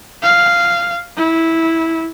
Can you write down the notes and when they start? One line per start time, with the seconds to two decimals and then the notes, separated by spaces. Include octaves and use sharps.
0.23 F5
1.16 E4